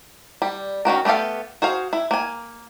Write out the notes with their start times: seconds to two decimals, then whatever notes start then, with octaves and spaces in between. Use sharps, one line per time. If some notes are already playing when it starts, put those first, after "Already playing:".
0.42 G3
0.85 D#3 C#4 F#4 A#4
1.05 A3 B3 G4 A4 F5
1.62 F#4 G#4 C5 F5
1.93 E4
2.11 A#3 G#5